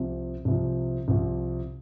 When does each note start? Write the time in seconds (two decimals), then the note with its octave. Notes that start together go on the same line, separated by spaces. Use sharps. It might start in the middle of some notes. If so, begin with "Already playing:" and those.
Already playing: C2 C3 F3
0.45 C2 C3 F3
1.08 C2 C3 F3